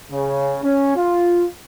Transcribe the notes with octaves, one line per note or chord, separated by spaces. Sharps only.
C#3
C#4
F4